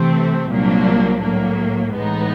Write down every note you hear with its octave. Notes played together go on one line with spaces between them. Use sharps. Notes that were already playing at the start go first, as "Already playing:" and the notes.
Already playing: C3 E3 A3 C4
C2 A#2 F#3 A#3 D4
A2 F#3 A#3
A2 E3 G#3 B3 D#4